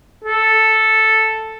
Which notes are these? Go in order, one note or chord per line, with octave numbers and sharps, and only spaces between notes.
A4